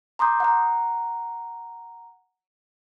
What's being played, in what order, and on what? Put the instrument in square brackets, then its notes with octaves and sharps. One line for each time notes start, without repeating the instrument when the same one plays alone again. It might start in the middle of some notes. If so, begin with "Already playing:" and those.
[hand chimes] A#5 C6 D6 D#6 G6
F#5 A#5